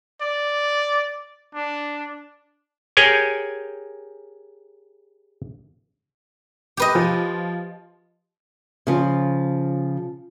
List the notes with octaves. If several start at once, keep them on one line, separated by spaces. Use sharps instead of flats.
D5
D4
G4 G#4 A#4 C#5 G5 G#5
G4 B4 D#5
F3
C#3 F3